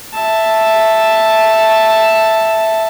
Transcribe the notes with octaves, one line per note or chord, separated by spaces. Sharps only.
E5 A5